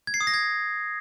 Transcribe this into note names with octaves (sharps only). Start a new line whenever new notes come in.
G#6
C7
D#6
A#6
G#6